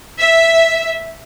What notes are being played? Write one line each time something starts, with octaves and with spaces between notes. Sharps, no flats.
E5